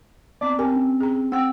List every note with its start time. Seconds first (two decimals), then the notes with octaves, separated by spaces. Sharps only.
0.41 B3 C4 D5 D6
0.59 C4 G4 A#4 G#5 A5
0.75 C#4
1.00 G#4 A#5
1.32 C4 F#5 G5 E6